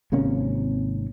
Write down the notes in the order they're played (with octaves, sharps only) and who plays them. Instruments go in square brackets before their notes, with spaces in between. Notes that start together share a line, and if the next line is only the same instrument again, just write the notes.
[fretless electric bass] G#1 C3 A#3 C#4